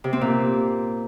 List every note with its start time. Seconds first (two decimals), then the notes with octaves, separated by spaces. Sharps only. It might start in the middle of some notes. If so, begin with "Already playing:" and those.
0.04 C3
0.13 C4
0.21 A#2